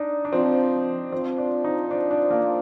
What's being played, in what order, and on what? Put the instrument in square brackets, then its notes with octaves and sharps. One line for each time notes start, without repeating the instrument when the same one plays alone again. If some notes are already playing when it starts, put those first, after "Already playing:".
Already playing: [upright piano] D4 D#4
D4
[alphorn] F3 [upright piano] C4
[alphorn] F3 [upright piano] C4
[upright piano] D4
D#4
D4
D4
A#3